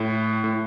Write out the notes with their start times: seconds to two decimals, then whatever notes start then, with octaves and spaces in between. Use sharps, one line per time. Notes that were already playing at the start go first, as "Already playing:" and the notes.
Already playing: A2
0.44 A2